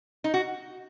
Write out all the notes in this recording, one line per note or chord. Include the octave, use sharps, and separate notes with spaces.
D#4
F#4